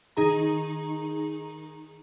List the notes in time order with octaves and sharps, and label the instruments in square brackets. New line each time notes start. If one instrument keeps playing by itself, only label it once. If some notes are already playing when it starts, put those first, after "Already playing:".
[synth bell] D#3 D#4 G#4 A#5